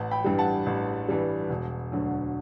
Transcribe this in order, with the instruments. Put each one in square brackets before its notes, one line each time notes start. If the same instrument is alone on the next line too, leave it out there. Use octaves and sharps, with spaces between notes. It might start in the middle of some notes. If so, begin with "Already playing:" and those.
Already playing: [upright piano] A1 F#5 A5
G5 B5
G2 E3 G3
F#5 A5
A1
G2 E3 G3
E1
D2 D3 F#3